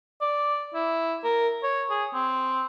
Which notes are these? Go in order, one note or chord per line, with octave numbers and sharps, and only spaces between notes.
D5
E4
A#4
C#5
G#4
C4